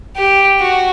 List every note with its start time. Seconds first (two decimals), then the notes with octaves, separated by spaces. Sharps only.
0.17 G4
0.60 F#4